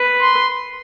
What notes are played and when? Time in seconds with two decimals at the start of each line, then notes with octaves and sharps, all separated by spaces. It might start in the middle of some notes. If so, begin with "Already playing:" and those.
Already playing: B4
0.21 C6